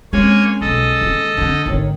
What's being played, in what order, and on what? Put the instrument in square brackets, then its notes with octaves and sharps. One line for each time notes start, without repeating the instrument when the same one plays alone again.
[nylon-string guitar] G#3 C#4 [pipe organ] A#3 C#5 G#5 [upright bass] C4
[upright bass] B1 [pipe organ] A4 D#5
[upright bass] D#3 A#3
[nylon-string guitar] D3 [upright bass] A#3 C#4
[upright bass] G#1 D3 [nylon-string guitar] D#3 C#5